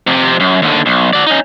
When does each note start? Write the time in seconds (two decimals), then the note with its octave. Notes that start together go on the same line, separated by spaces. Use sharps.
0.07 F2 C3
0.40 F#2
0.62 D#2 D3
0.86 B1
1.13 F#4 D5
1.27 C#4 D#4